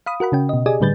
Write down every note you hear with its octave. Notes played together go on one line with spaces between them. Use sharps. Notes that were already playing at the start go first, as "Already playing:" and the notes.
F5 B5 D#6
F#4 A#4 F#5 B5
C#3 C#4 G5
B2 D#5
G4 G#4 D5 D#5 G#5
A2 D3 G3 B4 G6 A6